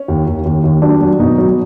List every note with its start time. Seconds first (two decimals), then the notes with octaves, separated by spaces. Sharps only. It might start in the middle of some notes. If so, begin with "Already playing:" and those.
Already playing: C#4
0.08 D#2
0.27 D#2
0.45 D#2
0.64 D#2
0.82 F#3 D4
1.01 F#3
1.19 B2 D#4
1.38 F#3